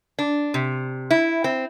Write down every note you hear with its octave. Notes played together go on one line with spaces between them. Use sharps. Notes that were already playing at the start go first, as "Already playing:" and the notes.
D4
C3
E4
C4